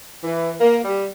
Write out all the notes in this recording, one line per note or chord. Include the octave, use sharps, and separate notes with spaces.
E3
A#3
G3